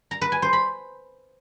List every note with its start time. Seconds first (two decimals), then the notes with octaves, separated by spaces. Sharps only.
0.11 A#5
0.21 B4
0.32 G#5
0.42 C5
0.53 B5